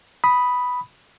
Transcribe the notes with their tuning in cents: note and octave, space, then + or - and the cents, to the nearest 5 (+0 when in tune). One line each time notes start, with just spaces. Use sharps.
B5 +0 D#6 +0